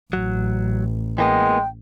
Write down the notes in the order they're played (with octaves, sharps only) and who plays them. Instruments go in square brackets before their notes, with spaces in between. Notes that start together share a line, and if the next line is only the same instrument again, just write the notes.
[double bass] A1 [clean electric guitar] F#3
[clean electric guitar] E3 A#3 B3 [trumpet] G#3 [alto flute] G5